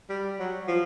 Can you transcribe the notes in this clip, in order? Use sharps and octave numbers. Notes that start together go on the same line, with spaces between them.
G3
F#3
F3